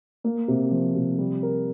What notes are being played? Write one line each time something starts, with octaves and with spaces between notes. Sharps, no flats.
A#3
C3
F3
C3
G3
A#4